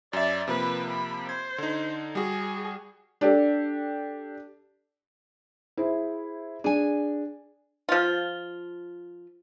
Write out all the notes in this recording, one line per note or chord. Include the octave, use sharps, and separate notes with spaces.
F#2 D5 E5
C3 F3 A#3 B4
B5
C5 G#6
D3 D#4
G3 F#4 G#4
D4 G4 A4
E4 G#4 C5
D4 G#4 G#5
F3 F4